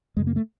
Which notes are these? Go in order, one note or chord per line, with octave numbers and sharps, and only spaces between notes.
F#2 C#3 G#3
A#3
A3